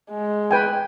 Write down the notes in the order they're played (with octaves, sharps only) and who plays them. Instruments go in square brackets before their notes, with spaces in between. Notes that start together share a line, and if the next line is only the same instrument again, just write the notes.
[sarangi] G#3
[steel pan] B4 G5 G#5